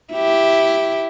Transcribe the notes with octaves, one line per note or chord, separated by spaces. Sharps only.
E4 G4